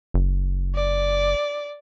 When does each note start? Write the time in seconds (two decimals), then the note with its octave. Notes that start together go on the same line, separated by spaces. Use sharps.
0.14 F#1
0.75 D5